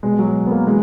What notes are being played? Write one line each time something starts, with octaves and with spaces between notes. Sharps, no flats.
B2 G#3
F#3
B3
A#3
E3 G#3